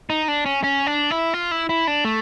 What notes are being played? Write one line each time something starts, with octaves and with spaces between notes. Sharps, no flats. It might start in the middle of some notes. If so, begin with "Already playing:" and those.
D#4
D4
C#4
C#4
D4
E4
F4
E4
E4
D4
A3